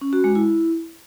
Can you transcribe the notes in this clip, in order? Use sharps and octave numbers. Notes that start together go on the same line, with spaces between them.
C#4
F#4
G#3
E4